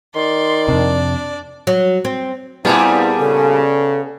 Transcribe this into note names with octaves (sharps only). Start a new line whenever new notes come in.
D#3 D5 C6
F2 C3 D4
F#3
C4
A#2 G3 B3 C4 D4 E4 G#4
C#3 A4